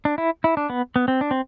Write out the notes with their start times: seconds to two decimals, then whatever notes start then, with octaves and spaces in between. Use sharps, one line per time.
0.05 D4
0.18 E4
0.44 E4
0.57 D4
0.70 B3
0.96 B3
1.08 C4
1.21 D4
1.31 C4